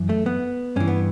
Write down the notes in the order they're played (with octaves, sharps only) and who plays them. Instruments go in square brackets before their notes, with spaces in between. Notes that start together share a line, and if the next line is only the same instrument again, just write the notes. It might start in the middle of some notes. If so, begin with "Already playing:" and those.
Already playing: [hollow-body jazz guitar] F#2 E3
A3
B3
G2 E3 C#4
B3